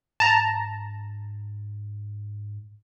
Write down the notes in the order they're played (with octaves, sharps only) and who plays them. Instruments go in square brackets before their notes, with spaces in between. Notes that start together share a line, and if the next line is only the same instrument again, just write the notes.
[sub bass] G#2 [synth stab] A5 A#5